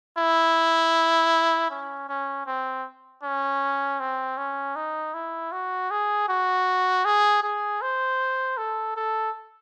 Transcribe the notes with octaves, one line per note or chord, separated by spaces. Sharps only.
E4
C#4
C#4
C4
C#4
C4
C#4
D#4
E4
F#4
G#4
F#4
G#4
G#4
C5
A4
A4